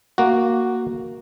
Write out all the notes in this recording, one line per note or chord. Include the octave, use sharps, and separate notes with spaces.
A#3 F#4